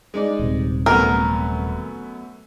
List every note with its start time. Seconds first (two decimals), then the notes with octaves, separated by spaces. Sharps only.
0.14 G#3 D#4 D5
0.39 D#1 C3
0.86 F#2 A3 B3 A#4